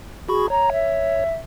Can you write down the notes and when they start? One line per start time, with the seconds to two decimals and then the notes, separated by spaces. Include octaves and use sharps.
0.29 F#4 G#4 B5 C#6
0.50 C#5 A#5
0.72 E5